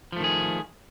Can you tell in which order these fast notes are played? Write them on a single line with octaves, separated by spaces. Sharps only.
F3 A3 D#3 G#4